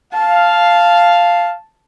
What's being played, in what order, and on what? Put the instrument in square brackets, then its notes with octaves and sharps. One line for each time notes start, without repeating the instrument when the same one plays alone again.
[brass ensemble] F5 [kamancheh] A5